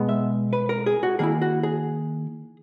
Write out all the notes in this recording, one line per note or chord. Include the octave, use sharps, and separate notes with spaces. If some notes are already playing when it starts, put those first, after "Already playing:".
Already playing: B2 G#3 B3
E5
B4
A#4
G#4
F#4
D#3 A#3 E4 G#4
F#4
G#4